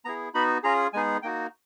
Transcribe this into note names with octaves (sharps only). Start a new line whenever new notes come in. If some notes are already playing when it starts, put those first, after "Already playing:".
B3 E4 G#4 A#5
B3 D#4 F#4 B5
C#4 F4 G#4 A#5
G#3 B3 D#4 G#4 G#5
A#3 D#4 F#4 G5